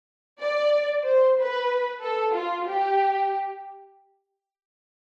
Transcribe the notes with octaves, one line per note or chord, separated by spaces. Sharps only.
D5
C5
B4
A4
F4
G4